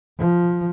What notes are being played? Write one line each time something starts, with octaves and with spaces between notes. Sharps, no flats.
F3